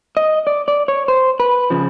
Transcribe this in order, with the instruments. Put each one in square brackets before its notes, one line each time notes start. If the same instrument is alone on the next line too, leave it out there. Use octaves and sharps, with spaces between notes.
[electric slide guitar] D#5
D5
D5
C#5
C5
B4
C#3 F3